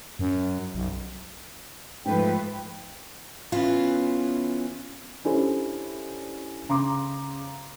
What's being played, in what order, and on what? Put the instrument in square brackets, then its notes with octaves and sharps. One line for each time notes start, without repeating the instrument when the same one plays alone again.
[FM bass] F#2
B1
[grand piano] G#2 [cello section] F3 A3 B4 [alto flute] G5
[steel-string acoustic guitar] E3 B3 C#4 F4
[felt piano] C#4 D4 E4 G4 A4 C5
C#3 A#5 C6 D6